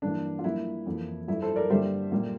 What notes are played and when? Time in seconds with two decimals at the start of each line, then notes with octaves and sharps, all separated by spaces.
0.02 G2 E3 A#3 D4
0.39 F4
0.44 G2 F3 A#3 E4
0.86 F2 E3 A#3
1.28 G2 F3 A3 E4
1.42 A4 C5
1.56 A#4 D5
1.70 G2 D3 G3 A#3 C5 E5
2.12 A#2 G3 A#3